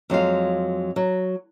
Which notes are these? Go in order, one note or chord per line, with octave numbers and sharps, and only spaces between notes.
F2 F#3 G#3 F5
F#3